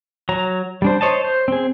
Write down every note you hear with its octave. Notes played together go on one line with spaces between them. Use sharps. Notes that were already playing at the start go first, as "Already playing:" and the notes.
F#3 A#5
G3 D4 C5
C5 C#5 D#5 A5
C5
C4 G#4